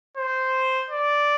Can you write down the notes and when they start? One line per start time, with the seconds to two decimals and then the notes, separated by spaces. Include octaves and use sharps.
0.17 C5
0.90 D5